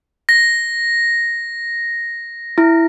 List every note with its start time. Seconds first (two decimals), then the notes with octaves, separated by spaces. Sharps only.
0.29 A#6
2.58 E4